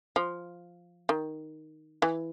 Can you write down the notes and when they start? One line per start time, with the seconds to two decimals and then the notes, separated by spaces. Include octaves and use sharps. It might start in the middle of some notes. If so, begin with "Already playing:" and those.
0.16 F3
1.09 D#3
2.02 E3